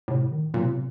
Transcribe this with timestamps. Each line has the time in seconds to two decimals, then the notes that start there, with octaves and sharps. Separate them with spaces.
0.08 A2 C3
0.31 D#3
0.54 A#2 F#3
0.61 C3
0.69 A#2
0.75 C3